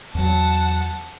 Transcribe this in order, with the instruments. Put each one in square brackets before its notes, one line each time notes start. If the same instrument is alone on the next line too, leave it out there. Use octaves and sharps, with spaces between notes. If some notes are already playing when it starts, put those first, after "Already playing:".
[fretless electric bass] E2 F#3 [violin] F#5 A5